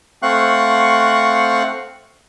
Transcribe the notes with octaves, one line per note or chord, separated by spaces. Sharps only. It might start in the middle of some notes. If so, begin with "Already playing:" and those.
A3 C4 F5 F#5 C#6 F#6